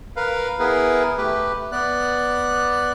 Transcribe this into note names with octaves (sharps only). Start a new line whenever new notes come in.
A#4 B4 F5
B3 E4 G#4 A#4 B4
A3 G4 B4
B3 D5 F#6